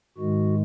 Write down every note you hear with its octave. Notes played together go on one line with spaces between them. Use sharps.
G#2 D#3 G#3 F#4